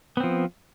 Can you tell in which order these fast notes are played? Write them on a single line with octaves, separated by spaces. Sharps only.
B3 C4 F3